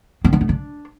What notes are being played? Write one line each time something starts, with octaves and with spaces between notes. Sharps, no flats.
C4
B3
A3
D4